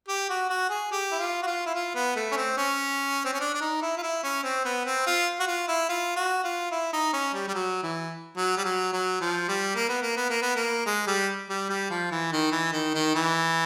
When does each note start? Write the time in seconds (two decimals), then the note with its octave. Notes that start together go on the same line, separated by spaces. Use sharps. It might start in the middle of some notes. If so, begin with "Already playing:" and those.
0.08 G4
0.29 F#4
0.50 F#4
0.70 G#4
0.92 G4
1.12 E4
1.19 F4
1.42 F#4
1.47 F4
1.66 E4
1.75 F4
1.94 B3
2.16 A3
2.32 C#4
2.36 C4
2.57 C#4
3.25 C4
3.33 C#4
3.41 D4
3.55 D4
3.61 D#4
3.82 E4
3.98 F4
4.03 E4
4.23 C#4
4.44 C4
4.65 B3
4.86 C4
5.06 F4
5.39 F#4
5.47 F4
5.68 E4
5.89 F4
6.16 F#4
6.44 F4
6.71 E4
6.93 D#4
7.13 C#4
7.34 G3
7.48 G3
7.54 F#3
7.83 E3
8.37 F#3
8.57 G3
8.65 F#3
8.93 F#3
9.21 F3
9.48 G3
9.75 A#3
9.89 B3
10.02 A#3
10.16 B3
10.30 A#3
10.42 B3
10.56 A#3
10.86 G#3
11.07 G3
11.49 G3
11.69 G3
11.90 F3
12.12 E3
12.32 D#3
12.52 E3
12.73 D#3
12.94 D#3
13.15 E3